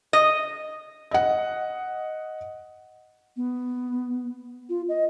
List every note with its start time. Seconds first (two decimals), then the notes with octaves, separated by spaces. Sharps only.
0.13 D#5
1.11 D#5 F#5
3.36 B3
4.69 F4
4.89 D#5